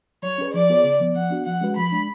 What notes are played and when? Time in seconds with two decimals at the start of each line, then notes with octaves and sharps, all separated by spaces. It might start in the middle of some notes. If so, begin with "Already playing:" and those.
0.22 F#3 C#5
0.38 C#4 G#4 B4
0.54 F3 D5
0.70 B3 F4 G#4 C#5
0.84 C#3
0.99 F3 B3
1.14 F3 F#5
1.30 B3 D4 F#4
1.46 F3 F#5
1.61 G#3 C#4 F#4 B4
1.76 F3 B5
1.92 G#3 D4